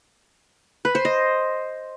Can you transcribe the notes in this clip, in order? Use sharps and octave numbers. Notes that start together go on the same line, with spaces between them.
B4
C5
D#5